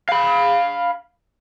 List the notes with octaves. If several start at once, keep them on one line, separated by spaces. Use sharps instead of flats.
F5 B5